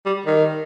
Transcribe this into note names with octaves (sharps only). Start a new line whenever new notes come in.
G3
D#3